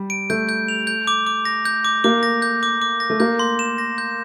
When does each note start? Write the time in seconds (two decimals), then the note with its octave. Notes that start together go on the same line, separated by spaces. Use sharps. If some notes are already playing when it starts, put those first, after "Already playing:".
Already playing: G3
0.10 D7
0.30 A3 G6
0.49 G6
0.68 F7
0.87 G6
1.07 D6
1.27 D6
1.45 A#6
1.65 G6
1.85 D6
2.04 A#3 D6
2.23 A#6
2.42 G6
2.63 D6
2.82 D6
3.00 A#6
3.10 A3
3.20 A#3 G6
3.39 C6
3.59 E7
3.78 A#6
3.98 G6